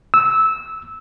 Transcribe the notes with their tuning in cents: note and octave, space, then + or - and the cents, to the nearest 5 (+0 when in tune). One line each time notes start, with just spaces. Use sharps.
E6 -15